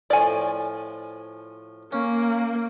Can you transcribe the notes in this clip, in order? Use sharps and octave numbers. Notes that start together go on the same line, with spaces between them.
A2 F3 D5 G#5
A#3 C#4